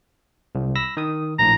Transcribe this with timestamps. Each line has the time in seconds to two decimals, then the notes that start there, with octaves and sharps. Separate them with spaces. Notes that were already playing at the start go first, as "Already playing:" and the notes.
0.55 C2
0.76 B5 E6 A#6
0.97 D#3 D#6
1.39 A#1 A2 A#5